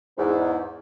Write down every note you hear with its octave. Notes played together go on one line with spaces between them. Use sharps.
E2 G#2